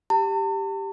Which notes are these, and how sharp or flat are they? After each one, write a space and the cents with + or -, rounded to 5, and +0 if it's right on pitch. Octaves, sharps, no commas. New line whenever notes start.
G4 +0 A5 +45